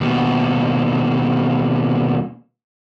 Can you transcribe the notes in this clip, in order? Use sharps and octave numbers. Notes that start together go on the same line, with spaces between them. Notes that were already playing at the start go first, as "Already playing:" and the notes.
D#2 B2